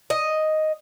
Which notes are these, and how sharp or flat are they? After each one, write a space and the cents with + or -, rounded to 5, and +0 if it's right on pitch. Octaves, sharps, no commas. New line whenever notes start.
D#5 +0